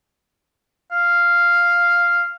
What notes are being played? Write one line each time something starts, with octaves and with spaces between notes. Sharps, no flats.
F5